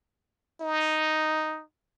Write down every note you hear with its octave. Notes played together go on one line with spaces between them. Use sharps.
D#4